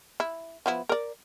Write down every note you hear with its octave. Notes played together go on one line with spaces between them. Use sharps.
E4
F3 B3 E4
A#4 D5